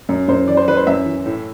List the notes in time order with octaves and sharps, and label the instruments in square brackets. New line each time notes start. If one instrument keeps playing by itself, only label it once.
[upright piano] F#2
F#2 C5
E3 D5
C5
E3 B4
C5
F#2 E5
E3
A2